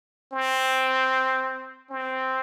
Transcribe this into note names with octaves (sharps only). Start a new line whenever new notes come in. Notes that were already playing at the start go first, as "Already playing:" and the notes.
C4
C4